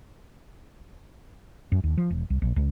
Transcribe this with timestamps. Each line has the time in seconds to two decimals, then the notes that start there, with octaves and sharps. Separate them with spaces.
1.72 F#2
1.84 D#2
1.97 F3
2.10 E1
2.30 C2
2.42 A#1
2.56 C#2